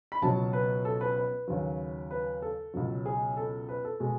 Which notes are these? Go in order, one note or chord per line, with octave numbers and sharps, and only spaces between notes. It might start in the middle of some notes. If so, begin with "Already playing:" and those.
B5
C#2 B2 F#3 A5
B4
A4
B4
B4
D#2 C#3 F#3
B4
A4
C#2 B2 F#3
G#4
A4
B4
A4
B2 G#3